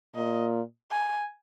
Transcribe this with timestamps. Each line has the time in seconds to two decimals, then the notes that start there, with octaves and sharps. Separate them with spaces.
0.15 A#2 D#5
0.91 G#5